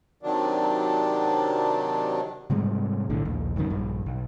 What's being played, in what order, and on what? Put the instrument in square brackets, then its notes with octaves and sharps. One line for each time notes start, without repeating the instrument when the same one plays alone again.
[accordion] C3 D#3 F#3 D4
[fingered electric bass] G#2 C3 G3 G#3
A#1 A2 D3
A#1 D#2
D1 C2 F#2 D#3
A#1 G2
B1